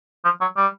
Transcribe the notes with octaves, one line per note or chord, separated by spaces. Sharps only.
F3
F#3
G3